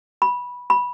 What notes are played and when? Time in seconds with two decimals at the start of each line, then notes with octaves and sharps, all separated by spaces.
0.22 B5
0.70 B5